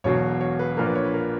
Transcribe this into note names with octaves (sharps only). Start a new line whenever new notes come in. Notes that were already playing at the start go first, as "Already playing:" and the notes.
E1 E2 B2 F#3 C#5
C#5
B4
A#1 A#2 A#3 A#4
B4
C#5
B4
A#4